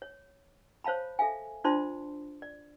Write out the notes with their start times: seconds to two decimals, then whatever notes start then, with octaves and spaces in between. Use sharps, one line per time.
0.02 C#5
0.84 C5 C#5 F5 A5 B5
1.19 A4 E5 F5 G#5
1.64 D4 F4 C5 D5 A5 C6
2.42 D5